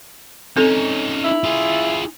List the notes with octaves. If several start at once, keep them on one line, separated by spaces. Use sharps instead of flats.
C4 C#4 D#4 A4
E4
F4 G#4